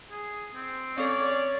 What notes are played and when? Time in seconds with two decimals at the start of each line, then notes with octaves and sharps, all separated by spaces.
0.11 G#4
0.55 C4
0.98 C4 C#4 A4 C#5 D5